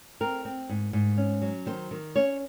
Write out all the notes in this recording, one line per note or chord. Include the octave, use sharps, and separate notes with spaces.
C4 A#4
C4
G#2
G#2
C#4
F#3
D#3 C5
D#3
C#4 C#5